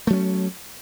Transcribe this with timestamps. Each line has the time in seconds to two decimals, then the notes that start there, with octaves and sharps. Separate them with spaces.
0.07 A3
0.10 F#3
0.13 C#4